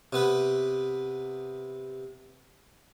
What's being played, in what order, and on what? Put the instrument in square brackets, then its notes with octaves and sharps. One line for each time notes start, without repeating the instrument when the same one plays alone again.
[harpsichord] C3 B3 B4